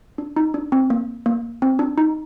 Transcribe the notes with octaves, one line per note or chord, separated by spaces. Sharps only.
D4
D#4
D4
C4
A#3
A#3
C4
D4
D#4